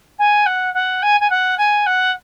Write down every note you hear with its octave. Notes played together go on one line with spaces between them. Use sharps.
G#5
F#5
F#5
G#5
G#5
F#5
G#5
F#5